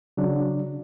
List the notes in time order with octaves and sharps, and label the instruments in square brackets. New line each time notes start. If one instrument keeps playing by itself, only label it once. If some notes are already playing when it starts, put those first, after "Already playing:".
[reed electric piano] C#3 F#3 D4